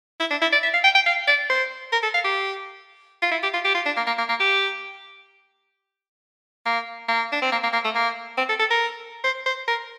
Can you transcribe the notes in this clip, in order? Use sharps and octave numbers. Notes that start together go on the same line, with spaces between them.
E4
D4
E4
D5
E5
F5
G5
G5
F5
D5
C5
A#4
A4
F5
G4
F4
E4
G4
F4
G4
F4
D4
A#3
A#3
A#3
A#3
G4
A#3
A#3
D4
C4
A#3
A#3
A#3
A3
A#3
C4
A4
A4
A#4
C5
C5
A#4